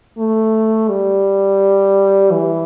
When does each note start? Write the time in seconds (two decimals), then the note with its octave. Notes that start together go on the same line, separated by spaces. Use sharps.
0.18 A3
0.89 G3
2.31 E3